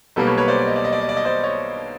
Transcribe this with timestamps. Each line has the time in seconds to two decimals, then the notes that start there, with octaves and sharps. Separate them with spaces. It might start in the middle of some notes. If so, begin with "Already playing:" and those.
0.16 B1 B2 G3 A#3 A4 B4
0.27 B4 C#5
0.38 B4 C#5
0.48 C5 D5
0.59 D5
0.67 D#5
0.76 D5
0.84 D#5
0.92 D5
1.01 D#5
1.09 D5
1.17 D#5
1.25 C5 D5
1.43 C#5 D#5